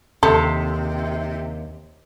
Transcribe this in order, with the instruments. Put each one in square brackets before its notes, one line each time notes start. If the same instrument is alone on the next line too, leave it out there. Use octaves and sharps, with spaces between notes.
[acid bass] D#2 [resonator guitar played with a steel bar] C3 [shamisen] A4